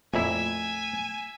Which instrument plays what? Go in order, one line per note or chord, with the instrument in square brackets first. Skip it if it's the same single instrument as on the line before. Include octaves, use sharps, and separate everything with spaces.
[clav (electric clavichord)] F2 A#2 E4 [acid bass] A3 [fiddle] E5 [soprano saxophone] G#5